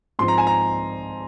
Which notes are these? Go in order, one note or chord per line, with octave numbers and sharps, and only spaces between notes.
G#2 F3 C4 C6
A#5
G#5
A#5